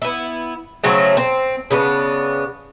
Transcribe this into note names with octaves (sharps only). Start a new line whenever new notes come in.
B3 E4
C#3 F#3 A3 C4
C4
C#3 B3 D4